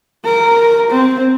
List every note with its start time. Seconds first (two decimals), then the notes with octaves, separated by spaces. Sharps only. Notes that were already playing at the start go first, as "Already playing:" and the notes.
0.25 A#4
0.91 C4